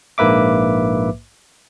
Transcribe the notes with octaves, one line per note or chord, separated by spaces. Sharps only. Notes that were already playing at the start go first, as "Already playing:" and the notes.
A#1 G#2 A#3 B4 E5 D6